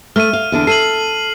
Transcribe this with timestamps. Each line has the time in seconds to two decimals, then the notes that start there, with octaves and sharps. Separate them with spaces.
0.16 A3 F6 D#7
0.33 F5
0.52 E2 D3 D4
0.67 A4 C7 D#7 F#7